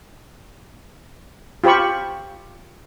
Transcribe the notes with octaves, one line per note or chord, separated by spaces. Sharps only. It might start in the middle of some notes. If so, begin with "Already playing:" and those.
F4 G4 C5 B5 C#6